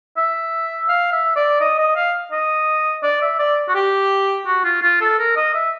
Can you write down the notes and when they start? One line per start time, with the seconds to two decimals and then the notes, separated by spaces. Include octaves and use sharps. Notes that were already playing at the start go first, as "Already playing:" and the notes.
0.17 E5
0.89 F5
1.12 E5
1.36 D5
1.61 D#5
1.79 D#5
1.96 F5
2.32 D#5
3.03 D5
3.22 E5
3.39 D5
3.68 F#4
3.75 G4
4.46 F#4
4.64 F4
4.82 F4
5.01 A4
5.19 A#4
5.37 D#5
5.54 E5